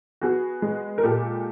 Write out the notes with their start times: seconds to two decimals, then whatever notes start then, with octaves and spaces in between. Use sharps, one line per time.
0.21 B3 F#4 G#4
0.62 G#3
0.98 A#4
1.03 A#2 G4 A4